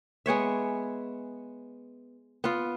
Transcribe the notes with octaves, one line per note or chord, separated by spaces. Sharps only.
G#3 B3 C#5 E5
B3 F4